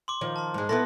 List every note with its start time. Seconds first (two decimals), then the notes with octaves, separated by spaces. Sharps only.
0.08 C6 D6
0.21 D#3 F3
0.36 A5 C6
0.54 G#2 G#3
0.69 B3 E4 A4 C6 A#6